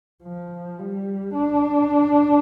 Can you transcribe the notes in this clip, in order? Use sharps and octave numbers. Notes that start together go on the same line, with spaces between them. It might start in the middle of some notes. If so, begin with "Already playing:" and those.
F3
G3
D4